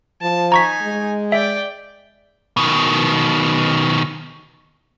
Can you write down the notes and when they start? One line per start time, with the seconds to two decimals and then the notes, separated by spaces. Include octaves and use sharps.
0.22 F3 A5
0.52 D#4 G#5 A#5 C#6 B6
0.82 G#3
1.32 D5 E5 G5
2.57 B2 D#3